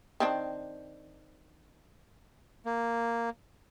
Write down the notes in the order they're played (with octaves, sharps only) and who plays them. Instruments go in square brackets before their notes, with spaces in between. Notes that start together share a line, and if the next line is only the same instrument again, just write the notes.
[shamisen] D#3 C4 D4
[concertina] A#3